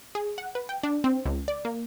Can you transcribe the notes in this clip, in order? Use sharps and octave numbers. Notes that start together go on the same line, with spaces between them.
G#4
F#5
B4
G5
D4
C4
C#2
D5
A#3